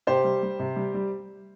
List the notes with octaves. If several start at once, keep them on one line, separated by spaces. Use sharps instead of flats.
C3 G4 C5
G3
G3
C3
G3
G3